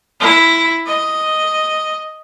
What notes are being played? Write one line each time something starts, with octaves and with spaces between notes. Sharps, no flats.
E4
D#5